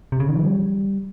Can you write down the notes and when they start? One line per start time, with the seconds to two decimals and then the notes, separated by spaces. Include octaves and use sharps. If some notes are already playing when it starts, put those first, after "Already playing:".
0.12 C3
0.20 C#3
0.28 D#3
0.36 F3
0.43 G3